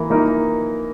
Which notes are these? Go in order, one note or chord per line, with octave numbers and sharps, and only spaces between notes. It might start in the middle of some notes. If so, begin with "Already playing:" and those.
Already playing: E3 A#3 A#4
A#3 D#4 A#4